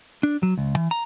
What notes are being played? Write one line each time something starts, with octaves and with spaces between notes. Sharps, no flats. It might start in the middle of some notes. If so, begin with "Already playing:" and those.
D4
F#3
C#2
E3
A#5